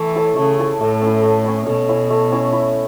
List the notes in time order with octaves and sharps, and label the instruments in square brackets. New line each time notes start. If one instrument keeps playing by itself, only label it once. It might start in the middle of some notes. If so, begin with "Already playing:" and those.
Already playing: [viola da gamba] E3 [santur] A3
[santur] E4 A4 C#5
[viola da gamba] C#3 [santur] A3
[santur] E4 A4 C#5
[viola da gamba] A2 [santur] A3
[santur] C#4
E4
A3
C#4 E4
[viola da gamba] B2 [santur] A3
[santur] C#4 E4
A3
C#4 E4
E4